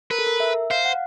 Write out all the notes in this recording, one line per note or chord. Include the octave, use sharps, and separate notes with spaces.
A#4 B4
A4
A#4
E5
C5 F5
F#5